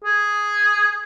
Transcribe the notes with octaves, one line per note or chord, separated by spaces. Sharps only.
G#4